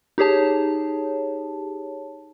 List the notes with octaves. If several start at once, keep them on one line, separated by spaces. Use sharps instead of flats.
D#4 G4 G#4 C#5 A5